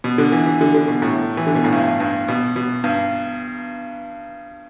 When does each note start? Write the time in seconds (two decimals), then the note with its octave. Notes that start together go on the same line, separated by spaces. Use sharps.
0.04 B2
0.18 D3
0.32 E3
0.46 E3
0.61 D3
0.74 D3
0.88 B2
1.02 A2
1.37 E3
1.47 D3
1.55 B2
1.64 A2
1.73 G2
2.00 G2
2.28 B2
2.56 B2
2.84 G2